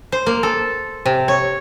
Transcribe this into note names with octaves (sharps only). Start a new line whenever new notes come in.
C5
A#3
A4
C3
C#5